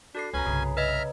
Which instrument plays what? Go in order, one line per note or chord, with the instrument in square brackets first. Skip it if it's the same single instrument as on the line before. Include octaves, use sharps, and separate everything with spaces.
[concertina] D4 [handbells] F#4 A4 C7
[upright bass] C#2 D#3 [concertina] C#4 G#5 [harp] B4 A#5
[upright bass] C2 G2 [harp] C#3
[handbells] B4 D#5 [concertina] E5 A#5 F6